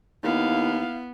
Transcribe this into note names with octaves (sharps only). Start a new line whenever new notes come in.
D#2 B3 E4 F5